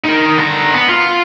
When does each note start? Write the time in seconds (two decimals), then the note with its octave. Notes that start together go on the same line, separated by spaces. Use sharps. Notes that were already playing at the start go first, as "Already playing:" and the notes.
0.05 D#4 A#4
0.38 D3 A#5
0.74 B3
0.88 F4